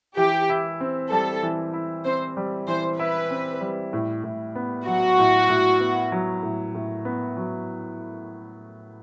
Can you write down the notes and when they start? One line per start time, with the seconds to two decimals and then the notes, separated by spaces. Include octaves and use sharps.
0.17 E3 G4
0.49 E4
0.80 C4
1.11 G3 A4
1.43 E3
1.73 E4
2.05 C4 C5
2.37 G3
2.68 E3 C5
2.99 E4 B4
3.31 C4
3.61 G3
3.93 A2
4.24 A2
4.55 B3
4.87 F#3 F#4
5.18 A2
5.49 A2
5.80 B3
6.12 F#3
6.43 A2
6.75 A2
7.05 B3
7.37 F#3